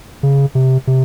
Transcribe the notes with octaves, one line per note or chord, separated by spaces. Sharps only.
C#3
C3
C3